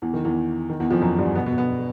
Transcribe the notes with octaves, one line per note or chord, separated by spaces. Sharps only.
E2 E3
D#3
E2 E3
D#3
E2 E3
F2 F3
F#2 F#3
G2 G3
B2 B3
B2 B3
B2 B3